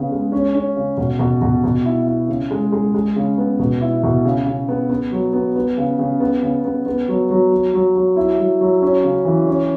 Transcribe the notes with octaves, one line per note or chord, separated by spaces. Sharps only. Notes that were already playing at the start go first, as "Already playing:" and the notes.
Already playing: C#3 B3
G#3
C#4
C#4
C#3
B2
B2
B2
B2
E4
E4
C#3
G#3
G#3
G#3
C#3
B3
B2
E4
B2
C#3
C#3
B3
B3
F#3
B3
B3
C#3
C#3
B3
C#3
B3
B3
F#3
F#3
F#3
F#3
F#3
E4
F#3
F#3
C#4
C#3
E3
C#4